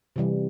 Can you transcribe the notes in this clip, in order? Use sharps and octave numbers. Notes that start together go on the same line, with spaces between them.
C3 E3 G3